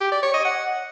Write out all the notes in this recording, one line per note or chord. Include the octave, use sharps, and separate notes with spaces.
G4
D5
C#5
D#5
F#5